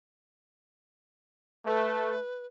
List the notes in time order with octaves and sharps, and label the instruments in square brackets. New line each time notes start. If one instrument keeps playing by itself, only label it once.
[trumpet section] A3 [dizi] B4